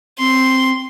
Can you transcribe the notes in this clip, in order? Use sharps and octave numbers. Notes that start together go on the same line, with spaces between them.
C4 C6